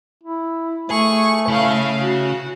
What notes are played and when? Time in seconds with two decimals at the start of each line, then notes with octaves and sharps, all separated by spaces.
0.23 E4
0.91 A3 G#4 C#6
1.48 C#3 E4 C#5 F5
2.02 F#4